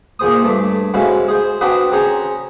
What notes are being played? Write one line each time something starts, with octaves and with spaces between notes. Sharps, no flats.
A#2 G#4 C5 D#6
G2 A3 D4
G#2 G#3 C#4 E4 F#4 F5
G#4 C5
C4 D4 F#4 B4 D#5 F#5
C#4 G#4 C5 C#5 A#5